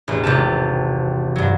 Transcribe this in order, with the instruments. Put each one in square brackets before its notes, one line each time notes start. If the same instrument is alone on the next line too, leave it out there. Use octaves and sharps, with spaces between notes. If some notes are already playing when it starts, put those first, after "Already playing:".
[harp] E1 A1
G#1 C3 G4 A5
G2 F#3